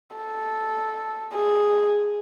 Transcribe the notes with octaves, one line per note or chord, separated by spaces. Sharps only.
A4
G#4